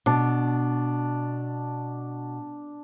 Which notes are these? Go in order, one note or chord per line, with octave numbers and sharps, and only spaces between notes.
B2 D4